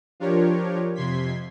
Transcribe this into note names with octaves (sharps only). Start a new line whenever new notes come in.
F3 D4 F4 G4 A#4 C#5
F2 C3 C6 G#6 B6